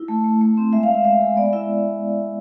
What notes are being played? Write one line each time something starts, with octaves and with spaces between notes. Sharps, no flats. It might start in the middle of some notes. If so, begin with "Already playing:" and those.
Already playing: E4
A3
A3
A3
C4
G#3 E5
F5
G#3
E5
G#3 E5
G#3
B3 D5
E4 E5